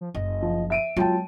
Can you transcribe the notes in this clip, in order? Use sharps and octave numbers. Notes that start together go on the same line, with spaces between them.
F3
F#1 D#5
F3
E5 D7 D#7
F#3 G#3 B3 F4 G5 A5